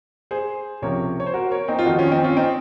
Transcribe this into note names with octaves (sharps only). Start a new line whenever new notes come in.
G#4 C5
C#2 C3 F3 A#4 C#5
C#5
C5
F#4 A#4
A#4 C#5
C4 D#4
F4
F2 D#3 D#4 F#4
C#4 F4
C4 D#4
C#4 F4
C4 D#4